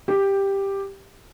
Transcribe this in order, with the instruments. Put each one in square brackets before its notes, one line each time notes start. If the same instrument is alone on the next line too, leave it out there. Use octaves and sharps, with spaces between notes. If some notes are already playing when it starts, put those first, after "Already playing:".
[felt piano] G4